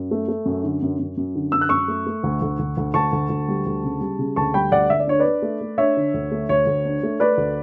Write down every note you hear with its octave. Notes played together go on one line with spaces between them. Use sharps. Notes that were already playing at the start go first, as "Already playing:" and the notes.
Already playing: F#2
A3
A3
F#2
D3
F#2
F#2
F#2
D3
F#2 E6
F#6
F#2 C#6 E6
A3
A3
D2
D2
D2
D2
D2 A5 C#6
D2
D2
G3
D2
C#3
G3
C#3
D2 A5 C#6
G3 G5 B5
D2 D5 F#5
D2 E5
D5
D4 C#5
B4 D5
D4
A3
A3
D4 C#5 E5
D3
D2
A3
D2 C#5
D2
D4
A3
A3 B4 D5
D2